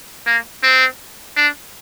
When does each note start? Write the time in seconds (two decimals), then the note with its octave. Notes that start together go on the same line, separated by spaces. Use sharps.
0.26 A#3
0.63 C4
1.36 D4